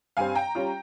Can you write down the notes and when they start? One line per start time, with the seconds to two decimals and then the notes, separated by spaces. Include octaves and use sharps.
0.17 G2 G3 C4 F5 G#5
0.35 G5 A#5
0.55 G3 C#4 F4